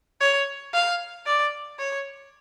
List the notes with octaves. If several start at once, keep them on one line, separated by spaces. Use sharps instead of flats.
C#5
F5
D5
C#5